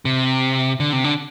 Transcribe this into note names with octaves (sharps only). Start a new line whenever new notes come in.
C3
D3
C3
D3